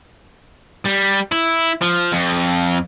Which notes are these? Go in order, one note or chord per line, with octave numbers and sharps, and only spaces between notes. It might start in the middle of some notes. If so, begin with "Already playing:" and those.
G3
E4
F3
F2